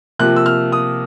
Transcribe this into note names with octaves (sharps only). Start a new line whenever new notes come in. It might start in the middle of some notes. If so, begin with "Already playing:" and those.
C3 F3 A#3 F#6
E6
F6
D#6